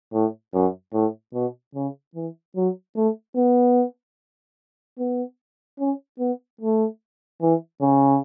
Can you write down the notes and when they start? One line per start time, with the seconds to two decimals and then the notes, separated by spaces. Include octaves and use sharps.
0.13 A2
0.54 F#2
0.93 A2
1.34 B2
1.75 C#3
2.15 E3
2.56 F#3
2.96 A3
3.36 B3
4.98 B3
5.79 C#4
6.19 B3
6.61 A3
7.41 E3
7.81 C#3